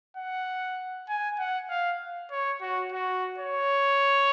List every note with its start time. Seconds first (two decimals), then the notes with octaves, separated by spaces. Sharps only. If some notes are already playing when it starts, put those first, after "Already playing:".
0.17 F#5
1.09 G#5
1.39 F#5
1.69 F5
2.31 C#5
2.61 F#4
2.92 F#4
3.38 C#5